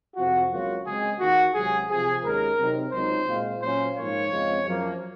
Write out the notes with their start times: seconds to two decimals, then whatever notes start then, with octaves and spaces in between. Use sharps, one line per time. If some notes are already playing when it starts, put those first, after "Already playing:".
0.16 F2 C3 F3 C4 F4 F#4
0.50 C#2 C#3 F#3 A#3 F4 F#4
0.85 C#3 G#3 C4 G#4
1.19 D#2 D#3 A#3 F4 F#4
1.54 C#2 C3 F#3 G#4
1.89 C3 F3 C4 F4 G#4
2.23 D#2 C#3 G#3 A#4
2.59 C3 F#3 C4 D#4
2.92 C#2 C#3 F#3 C4 D#4 C5
3.27 A#2 G#3 C4 F4
3.61 A#2 F#3 C#4 F4 C5
3.95 G#2 F3 A#3 F4 C#5
4.31 F2 C#3 G#3 C4 F4
4.65 F#2 F3 A#3